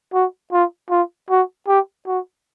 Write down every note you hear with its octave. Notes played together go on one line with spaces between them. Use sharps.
F#4
F4
F4
F#4
G4
F#4